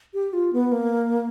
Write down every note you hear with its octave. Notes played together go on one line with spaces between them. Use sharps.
G4
F4
B3
A#3